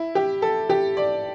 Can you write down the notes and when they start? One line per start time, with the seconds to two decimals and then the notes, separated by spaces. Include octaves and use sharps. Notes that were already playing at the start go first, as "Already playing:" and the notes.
Already playing: E4
0.15 G4
0.42 A4
0.70 G4
0.97 D5